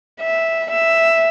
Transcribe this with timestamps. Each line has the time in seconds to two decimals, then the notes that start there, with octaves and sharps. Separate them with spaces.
0.21 E5
0.71 E5